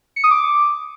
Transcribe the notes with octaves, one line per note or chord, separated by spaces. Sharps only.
C#7
D#6
D6